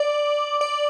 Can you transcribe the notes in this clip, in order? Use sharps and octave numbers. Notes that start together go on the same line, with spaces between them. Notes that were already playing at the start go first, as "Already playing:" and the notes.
Already playing: D5
D5